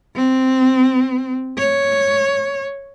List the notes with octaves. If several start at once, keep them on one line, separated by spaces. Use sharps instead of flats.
C4
C#5